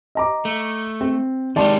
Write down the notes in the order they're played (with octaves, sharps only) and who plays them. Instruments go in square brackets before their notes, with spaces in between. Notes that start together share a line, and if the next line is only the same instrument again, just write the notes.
[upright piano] D#5 A#5 D6
[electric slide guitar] A3
[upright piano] C4
[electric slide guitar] D#3 G#3 G4 [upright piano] D5 A5 C6